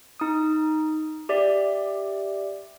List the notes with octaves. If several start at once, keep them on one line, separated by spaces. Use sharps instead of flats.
D#4 D#6
G4 D5 E5